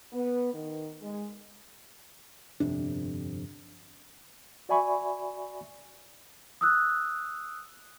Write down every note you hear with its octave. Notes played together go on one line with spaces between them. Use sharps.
B3
D#3
G#3
G1 F2 C3 D4
F#4 D5 E5 G#5 B5 C#6
D#6 E6 F#6